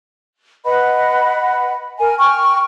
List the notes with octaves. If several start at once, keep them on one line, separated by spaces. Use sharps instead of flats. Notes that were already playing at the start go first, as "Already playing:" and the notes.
B4 D#5 F#5 B5
A#4 G#5
G5 C#6 F6